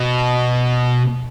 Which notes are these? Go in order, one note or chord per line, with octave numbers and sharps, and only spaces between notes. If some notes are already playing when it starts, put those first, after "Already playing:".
Already playing: B2